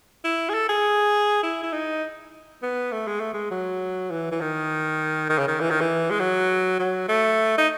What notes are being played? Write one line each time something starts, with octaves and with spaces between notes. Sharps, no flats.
E4
G#4
A4
G#4
E4
E4
D#4
B3
A3
G#3
A3
G#3
F#3
E3
E3
D#3
D#3
C#3
D#3
E3
D#3
E3
G#3
F#3
F#3
A3
D#4